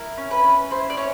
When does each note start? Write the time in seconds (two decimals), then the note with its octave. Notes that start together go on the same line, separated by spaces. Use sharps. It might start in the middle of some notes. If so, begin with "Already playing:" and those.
Already playing: E4 A#4
0.18 C#4
0.31 B4
0.44 C#4
0.70 E4 C5
0.90 D5
0.97 C#4 C#5